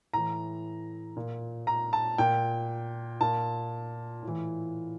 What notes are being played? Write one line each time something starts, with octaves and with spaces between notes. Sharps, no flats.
A2 E3 A#5
A#2
A#5
A5
A#2 G5
A#2 A5
A2
E3